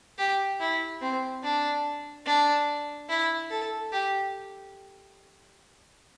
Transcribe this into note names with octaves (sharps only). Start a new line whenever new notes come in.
G4
E4
C4
D4
D4
E4
A4
G4